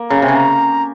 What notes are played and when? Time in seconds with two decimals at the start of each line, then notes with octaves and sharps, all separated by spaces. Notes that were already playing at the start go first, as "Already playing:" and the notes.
Already playing: A#3
0.10 C#3 A#5
0.22 C3 G#5
0.28 C#3
0.36 A#5